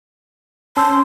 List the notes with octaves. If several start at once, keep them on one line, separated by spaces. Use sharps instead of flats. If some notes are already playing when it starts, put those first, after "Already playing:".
C#4 A5 C6 E6